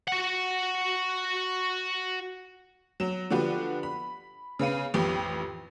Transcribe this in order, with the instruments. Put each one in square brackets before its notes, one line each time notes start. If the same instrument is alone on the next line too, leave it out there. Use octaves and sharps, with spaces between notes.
[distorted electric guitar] F#4 F#5
[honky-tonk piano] F#3 E7
D3 F3 D4 F#4 G4 B4
B5
C#3 B4 F5 D#7
A1 F2 G4 B4